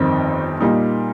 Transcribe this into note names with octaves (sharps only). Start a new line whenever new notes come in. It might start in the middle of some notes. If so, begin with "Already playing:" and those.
Already playing: G1 F2 D#3 C4 D#4
A#2 G3 A#3 D#4